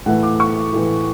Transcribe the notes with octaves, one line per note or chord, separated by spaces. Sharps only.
A2 E3 A3 E4 F#5
D6
C#6
A2 E3 A3 E4